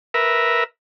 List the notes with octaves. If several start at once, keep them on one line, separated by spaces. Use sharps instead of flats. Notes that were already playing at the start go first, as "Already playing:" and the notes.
A#4 B4 E5